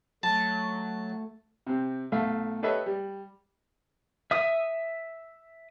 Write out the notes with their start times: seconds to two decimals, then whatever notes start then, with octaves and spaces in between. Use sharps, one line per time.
0.23 F#3 A3 A5
1.67 C3 C4
2.12 B1 A3 E5 F5
2.62 G4 A4 B4 C#5 D#5 E5
2.86 G3
4.31 E5 D#6